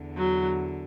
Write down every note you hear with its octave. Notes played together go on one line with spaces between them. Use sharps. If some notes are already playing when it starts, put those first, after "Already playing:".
Already playing: E2 D3
F#3